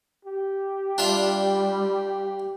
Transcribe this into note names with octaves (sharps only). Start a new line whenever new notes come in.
G4
G3 D4 F4 E5